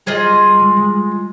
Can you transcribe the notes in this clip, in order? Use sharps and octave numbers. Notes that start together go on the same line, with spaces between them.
G3 F4 G#4 D#5
G#3
G#3